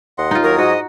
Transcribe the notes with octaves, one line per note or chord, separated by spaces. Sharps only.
D#2 D#5 F#5 C6
D#4 F4
F#3 A#4 C#5 D#6
G#2 F#4 D#5